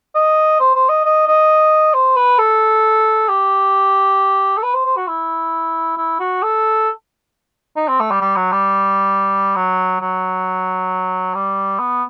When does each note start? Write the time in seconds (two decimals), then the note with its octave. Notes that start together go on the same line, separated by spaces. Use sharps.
0.15 D#5
0.60 C5
0.75 C5
0.89 D#5
1.05 D#5
1.27 D#5
1.94 C5
2.16 B4
2.39 A4
3.29 G4
4.58 A4
4.63 B4
4.74 C5
4.85 C5
4.97 F#4
5.08 E4
5.97 E4
6.20 F#4
6.43 A4
7.76 D#4
7.88 C4
8.00 A3
8.11 G3
8.21 G3
8.36 F#3
8.52 G3
9.56 F#3
10.01 F#3
11.35 G3
11.80 B3